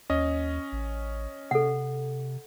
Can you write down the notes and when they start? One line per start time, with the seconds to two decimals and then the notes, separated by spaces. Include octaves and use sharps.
0.10 D#2 C#4 D#5
0.72 A1
1.51 C3 A4 F#5